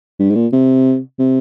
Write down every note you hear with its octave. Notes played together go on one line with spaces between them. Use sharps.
G2
G#2
A#2
C3
C3